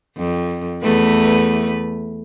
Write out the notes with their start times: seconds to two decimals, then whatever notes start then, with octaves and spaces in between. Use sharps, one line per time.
0.17 F2
0.83 E2 A3 B4